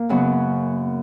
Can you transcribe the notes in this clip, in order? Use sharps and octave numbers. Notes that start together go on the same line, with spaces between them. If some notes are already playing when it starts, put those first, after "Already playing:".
Already playing: A#3
F#2 C#3 F#3 B3